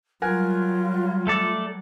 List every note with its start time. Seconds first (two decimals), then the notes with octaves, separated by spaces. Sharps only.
0.22 F#3 G3 F4 A#4 F#5 G#5
1.27 A3 A4 D5